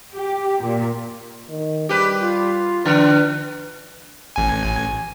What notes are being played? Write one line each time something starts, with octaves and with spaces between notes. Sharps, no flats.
G4
A#2
D#3
G3 G4 B4
F4
D3 D4 B4
A1 G#5